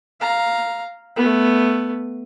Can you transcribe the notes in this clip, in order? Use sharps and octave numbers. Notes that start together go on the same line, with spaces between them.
F5 A#5
A3 B3